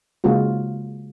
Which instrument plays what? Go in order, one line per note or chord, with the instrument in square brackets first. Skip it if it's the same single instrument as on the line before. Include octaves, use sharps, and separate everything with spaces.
[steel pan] C#3 G#3 A#3 F4 F#4